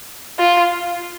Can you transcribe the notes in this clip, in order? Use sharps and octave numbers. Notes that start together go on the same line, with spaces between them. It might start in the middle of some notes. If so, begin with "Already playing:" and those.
F4